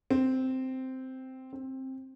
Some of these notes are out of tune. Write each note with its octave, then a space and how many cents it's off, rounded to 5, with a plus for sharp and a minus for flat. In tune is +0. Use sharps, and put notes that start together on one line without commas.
C4 -5
C4 +15